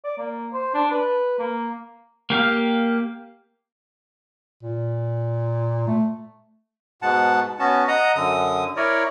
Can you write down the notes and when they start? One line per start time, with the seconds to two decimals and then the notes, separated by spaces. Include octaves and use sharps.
0.04 D5
0.18 A#3
0.53 C5
0.74 D4
0.91 B4
1.39 A#3
2.30 A#3 G4 F5
4.63 A#2
5.87 A3
7.02 G#2 B2 F#5 A5
7.59 B3 C#4 F#4 A5
7.88 D#5 F#5 A#5 D#6
8.15 F#2 D3 D#6
8.77 E4 A#4 C#5 D5